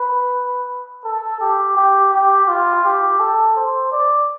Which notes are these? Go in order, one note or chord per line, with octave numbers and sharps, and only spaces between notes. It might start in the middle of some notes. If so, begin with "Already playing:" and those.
Already playing: B4
A4
G4
G4
G4
F4
G4
A4
C5
D5